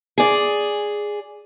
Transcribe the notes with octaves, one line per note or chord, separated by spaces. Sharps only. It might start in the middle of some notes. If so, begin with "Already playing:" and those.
G#4 D5